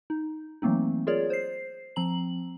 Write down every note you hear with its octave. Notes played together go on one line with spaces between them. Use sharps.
D#4
E3 F#3 A3 A#3 C4 D#4
F4 G#4 A#4 C#5 D5
C5 C7
F3 C4 A#5 F#7